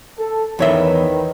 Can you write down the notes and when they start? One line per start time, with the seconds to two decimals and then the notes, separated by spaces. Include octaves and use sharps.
0.18 A4
0.59 E2 D#3 B4 C#5 E5